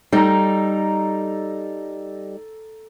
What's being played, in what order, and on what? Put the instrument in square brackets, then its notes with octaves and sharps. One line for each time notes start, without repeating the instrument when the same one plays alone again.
[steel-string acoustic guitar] G3 D#4 [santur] A4 A#5